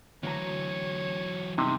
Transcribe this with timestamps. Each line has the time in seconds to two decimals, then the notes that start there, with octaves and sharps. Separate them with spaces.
0.23 D2 E3 F#3 C#5 A#5
1.58 E2 G2 C3 D#4